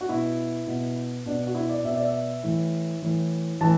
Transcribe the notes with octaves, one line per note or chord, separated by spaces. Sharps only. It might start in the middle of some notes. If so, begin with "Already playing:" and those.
F#4
B2 E4
B2
B2 D4
F#4
E4
D5
B2 E5
D5
E5
A2 E3
A2 E3
A2 E3 A5